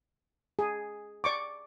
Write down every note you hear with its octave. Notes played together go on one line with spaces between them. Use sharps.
G#4
D5 C#6 D6